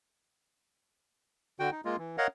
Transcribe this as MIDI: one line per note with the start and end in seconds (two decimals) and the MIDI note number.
1.60 1.70 50
1.60 1.70 66
1.60 1.70 79
1.72 1.81 63
1.85 1.96 56
1.85 1.96 58
1.85 1.96 65
1.98 2.16 52
2.18 2.27 70
2.18 2.27 73
2.18 2.27 75
2.18 2.27 77
2.18 2.27 78